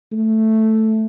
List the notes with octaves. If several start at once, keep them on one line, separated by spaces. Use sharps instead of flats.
A3